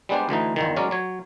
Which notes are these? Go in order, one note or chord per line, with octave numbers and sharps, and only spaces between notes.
G3 G#3 B3 D4 G4 C5
D2 D3 E3 D#4
G1 E2 D#3
F#3 G#3 C#4 A#4 D5
F#3 C#5